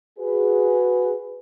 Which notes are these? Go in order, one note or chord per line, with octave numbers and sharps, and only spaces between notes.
F#4 G#4 B4